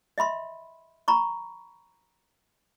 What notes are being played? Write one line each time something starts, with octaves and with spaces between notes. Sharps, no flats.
D#5 E5 B5 C6
A#5 B5 C#6